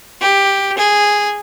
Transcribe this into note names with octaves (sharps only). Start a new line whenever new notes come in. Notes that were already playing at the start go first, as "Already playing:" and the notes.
G4
G#4